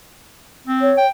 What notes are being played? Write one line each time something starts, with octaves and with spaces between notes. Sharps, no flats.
C4
C#5
G5